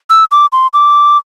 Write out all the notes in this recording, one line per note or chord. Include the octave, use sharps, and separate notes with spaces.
E6
D6
C6
D6